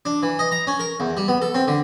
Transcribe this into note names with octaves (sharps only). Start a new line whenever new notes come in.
D4
E3
D#5
A#5
C#4
A#4
E2
G3
B3
A4
C4
D3